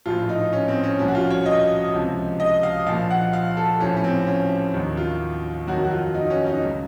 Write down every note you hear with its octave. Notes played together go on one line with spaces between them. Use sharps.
A#1 A2 F3 F4
D#4
C#4
C4
C#4
C2 A#2 F3 C#4
F#4
F4
C#5
D#5
C#2 C3 F3
D#5
F5
A#1 A#2 F3 F5
F#5
F5
A4
A1 A2 F3 C#4
C#4
C4
C#4
D#2 D#3 F#3
F4
F2 D#3 F#3 F#4
F#4
F4
D#4
C#4
D#4
C#2 C#3 F#3